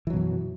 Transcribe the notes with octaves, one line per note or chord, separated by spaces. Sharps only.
F#2 B2 E3 F#3